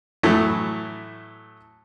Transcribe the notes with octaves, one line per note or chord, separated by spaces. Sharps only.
A2 E3 F#3 A3